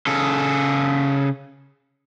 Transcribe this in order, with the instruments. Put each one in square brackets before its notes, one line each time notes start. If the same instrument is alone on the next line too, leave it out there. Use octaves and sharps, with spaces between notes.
[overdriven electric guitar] C#3 A4